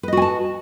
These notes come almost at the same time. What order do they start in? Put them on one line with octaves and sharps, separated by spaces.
B4 D#5 F#4 G#5 A5